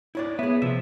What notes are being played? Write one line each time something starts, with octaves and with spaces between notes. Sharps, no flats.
E4 C#5 D5
B3 G#4 E5
C3 F3 E5